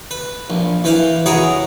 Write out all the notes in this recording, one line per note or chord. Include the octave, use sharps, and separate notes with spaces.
B4
A#1
E3 B4 C5 F5
F#4 G#4 A#4 B4 C#5 E5